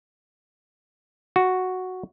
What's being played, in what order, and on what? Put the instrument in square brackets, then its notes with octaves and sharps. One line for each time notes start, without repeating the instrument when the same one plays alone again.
[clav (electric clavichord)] F#4